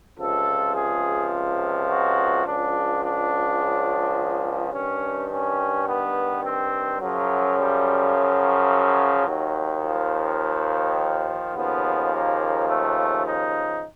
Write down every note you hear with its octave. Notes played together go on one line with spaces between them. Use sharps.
C#2 C3 F3 A4
G#4
F#4
C#2 C#3 F3 D4
D4
G2 D#3 C#4
C#4
B3
C4
F#2 C#3 F3 F#3
G3
F#3
D#2 D#3
F3
D#2 C#3 F3 B3
A#3
A3
D#4